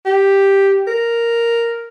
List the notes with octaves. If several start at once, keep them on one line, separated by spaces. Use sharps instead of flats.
G4
A#4